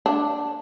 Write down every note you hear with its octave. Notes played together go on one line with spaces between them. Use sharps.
D4